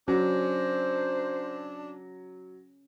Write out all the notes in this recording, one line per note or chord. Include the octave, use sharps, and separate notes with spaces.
F#3 C#4 D4 C5